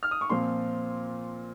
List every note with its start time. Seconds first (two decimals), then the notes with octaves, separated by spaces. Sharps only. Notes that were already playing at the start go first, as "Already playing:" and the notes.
0.03 F6
0.11 D#6
0.21 C#6
0.30 A#2 F3 C4 C6